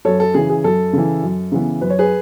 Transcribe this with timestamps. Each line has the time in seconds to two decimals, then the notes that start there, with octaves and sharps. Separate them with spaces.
0.05 F#2 A4 C#5
0.20 A4
0.34 C#3 E3 G#4
0.50 G#4
0.64 F#2 A4
0.93 C#3 E3
1.23 F#2
1.52 C#3 E3 B3
1.81 F#2 B4
1.90 C#5
1.99 G#4 B4